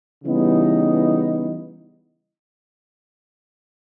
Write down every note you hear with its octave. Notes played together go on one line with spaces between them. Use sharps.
C#3 E3 G3 B3 D#4